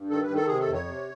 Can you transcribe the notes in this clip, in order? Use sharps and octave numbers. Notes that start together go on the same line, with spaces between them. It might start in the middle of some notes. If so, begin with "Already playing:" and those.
Already playing: G2
D#3 A4
B4
D#3
A4
C3 G#4
A4
F2
C#5
C3